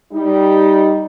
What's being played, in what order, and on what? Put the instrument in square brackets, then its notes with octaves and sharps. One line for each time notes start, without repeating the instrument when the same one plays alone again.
[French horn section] G3 D#4